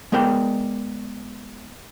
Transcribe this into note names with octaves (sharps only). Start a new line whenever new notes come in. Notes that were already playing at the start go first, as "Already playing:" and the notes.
G#3 B3 A#4 D5 G5